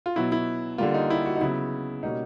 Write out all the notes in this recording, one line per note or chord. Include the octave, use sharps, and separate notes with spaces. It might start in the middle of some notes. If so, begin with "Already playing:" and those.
F4
B2 F#3 B3 E4
E4
D3 G3 A#3 F4
D#4
E4
F#4
D#4
C#3 F#3 B3 E4
B2 G3 A#3 C#4 D#4